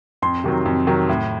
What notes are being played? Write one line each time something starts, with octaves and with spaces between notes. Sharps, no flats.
F2 C6
C3 D#3 F#3
F2
C3 D#3 F#3
A2